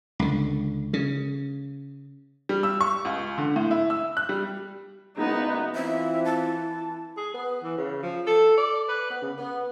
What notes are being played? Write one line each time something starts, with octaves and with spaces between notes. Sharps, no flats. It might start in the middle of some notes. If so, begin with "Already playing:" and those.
C#2 D3
C#3
G3
E6
C#6
C#2
D3
A2
E4
E6
F#6
G3
F#1 B3 D#4
E3 C4 F4 E5
A5
G#4
B3
E3
C#3
F3
A4
D5
B4
B3
C#3
B3